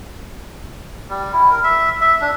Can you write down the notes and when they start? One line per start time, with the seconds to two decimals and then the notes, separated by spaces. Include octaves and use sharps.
1.09 G3
1.33 E4
1.51 A#4
1.64 E5
2.01 E5
2.21 D4